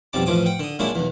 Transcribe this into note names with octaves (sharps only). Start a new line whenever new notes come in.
B1 F2 G3 A5 D6
A1 E3 F3 D6 D#6
F#5 G5
D3 D#6
A#2 F#3 G#3 A#3 D4 E4
B1 E2